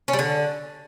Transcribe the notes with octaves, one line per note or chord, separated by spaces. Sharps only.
C#4
G3
D3